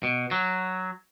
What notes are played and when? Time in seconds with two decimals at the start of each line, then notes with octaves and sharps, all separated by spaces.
0.03 B2
0.31 F#3